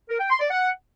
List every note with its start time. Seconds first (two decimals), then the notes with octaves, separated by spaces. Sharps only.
0.10 A#4
0.20 G5
0.30 C6
0.40 D5
0.50 F#5